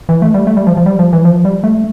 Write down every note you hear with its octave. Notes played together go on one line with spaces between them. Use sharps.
E3
A3
G3
A3
G3
F3
F3
G3
F3
E3
F3
G3
A3